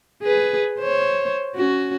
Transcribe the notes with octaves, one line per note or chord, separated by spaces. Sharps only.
G#4 B4
C5 C#5
C#4 F#4